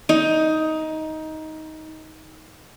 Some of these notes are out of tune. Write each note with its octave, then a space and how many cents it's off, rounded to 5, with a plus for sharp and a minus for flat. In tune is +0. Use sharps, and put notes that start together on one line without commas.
D#4 +15